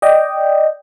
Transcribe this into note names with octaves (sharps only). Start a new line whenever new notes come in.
D5 D#5 G5